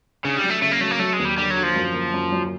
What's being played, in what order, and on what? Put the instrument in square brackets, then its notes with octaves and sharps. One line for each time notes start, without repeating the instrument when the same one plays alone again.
[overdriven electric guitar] C#3 [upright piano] D4
[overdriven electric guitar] G3
[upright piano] F#3
[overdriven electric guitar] A3
[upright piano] C#3 [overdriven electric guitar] A3
[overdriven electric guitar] A#3
[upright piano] F#3 [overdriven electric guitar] A3
[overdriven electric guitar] A#3
[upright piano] F#3 [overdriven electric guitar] A3
[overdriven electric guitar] G#3
[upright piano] D#2
[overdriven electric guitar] G3
[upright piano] D3 [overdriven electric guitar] G3
[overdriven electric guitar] F#3
[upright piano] D3
[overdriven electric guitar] F3
[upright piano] F#2
A#3
F#2
F#3